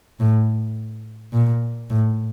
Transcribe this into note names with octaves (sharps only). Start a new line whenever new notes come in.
A2
A#2
A2